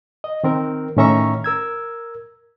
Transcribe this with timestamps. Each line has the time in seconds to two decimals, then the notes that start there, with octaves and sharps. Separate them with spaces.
0.24 D#5
0.44 D#3 C4 A#4
0.97 A2 D#3 C#4 E5 A#5 C#6
1.44 A#4 E6 G#6